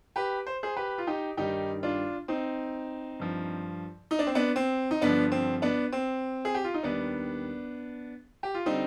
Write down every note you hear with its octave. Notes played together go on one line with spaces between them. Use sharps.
G4 B4
C5
G#4 C5
G4 B4
F4
D#4 G4
G2 D#3 G3 D#4 G4
D4 F4
C4 D#4
G2 F3
D#4
D4
C4
B3 D4
C4
D#4
G2 D3 F3 B3 D4
C4
B3 D4
C4
G#4
G4
F4
D#4
D#2 D#3 G3 B3 D4
G4
F4
D3 G3 C4 D#4